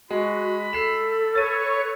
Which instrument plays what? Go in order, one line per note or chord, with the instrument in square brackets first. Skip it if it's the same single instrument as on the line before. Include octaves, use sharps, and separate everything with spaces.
[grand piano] G#3 [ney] F#4 [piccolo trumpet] B5
[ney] A4 [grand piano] C7 E7
[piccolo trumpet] B4 [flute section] C#5 [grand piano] A6 D#7